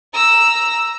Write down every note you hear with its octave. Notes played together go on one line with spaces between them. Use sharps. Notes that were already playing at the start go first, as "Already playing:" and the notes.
A#5 E6